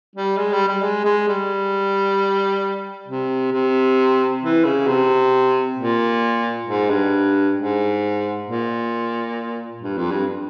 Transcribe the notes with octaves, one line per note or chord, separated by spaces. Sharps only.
G3
G#3
G3
G3
G#3
G#3
G3
C3
C3
E3
C#3
C3
A#2
G#2
G2
G#2
A#2
G2
F2
G2